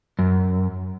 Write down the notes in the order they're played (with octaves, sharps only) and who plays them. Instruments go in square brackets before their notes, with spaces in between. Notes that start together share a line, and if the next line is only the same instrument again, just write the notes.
[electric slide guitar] F#2